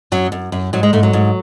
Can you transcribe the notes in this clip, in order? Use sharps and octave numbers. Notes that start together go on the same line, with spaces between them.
F#2 F#3
F#2
F#2
G#2 F#3
G#3
G#2 A3
F#3
G#2